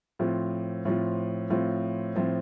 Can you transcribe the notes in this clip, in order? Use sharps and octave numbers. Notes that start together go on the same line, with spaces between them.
A2 F3 C4 F4
A2 F3 C4 F4
A2 F3 C4 F4
A2 F3 C4 F4